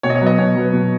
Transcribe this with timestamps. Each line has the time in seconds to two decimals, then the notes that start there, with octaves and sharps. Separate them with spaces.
0.03 B2 C#5
0.10 D#5
0.15 C#5
0.21 F#3 B3
0.26 D#5
0.38 B2 C#5
0.56 F#3 B3
0.73 B2